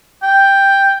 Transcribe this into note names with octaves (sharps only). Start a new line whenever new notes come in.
G5